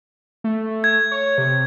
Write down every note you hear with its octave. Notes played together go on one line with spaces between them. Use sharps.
A3
G#6
C#5
C3